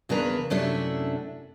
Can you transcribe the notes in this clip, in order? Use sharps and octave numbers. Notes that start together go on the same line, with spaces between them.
E2 C#3 A#3 D4 B4 A#5
F#2 C3 A3 C#4 D4 E4